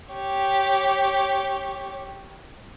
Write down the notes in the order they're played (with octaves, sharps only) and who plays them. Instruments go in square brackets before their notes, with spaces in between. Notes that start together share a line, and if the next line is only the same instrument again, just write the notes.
[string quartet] G4 C#5